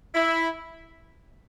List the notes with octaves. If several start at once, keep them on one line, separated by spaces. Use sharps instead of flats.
E4